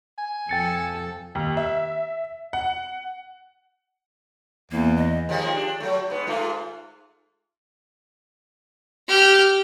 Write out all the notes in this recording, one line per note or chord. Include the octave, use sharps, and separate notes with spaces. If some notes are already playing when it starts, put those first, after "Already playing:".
G#5
F2 A4 G5 A6 C#7
D#2
E5
F#5
E2 A#3
D#5
D#2 F3 G#3
D4
F#3 A3
G#2 B3
G#2 A3 F4
G4 F6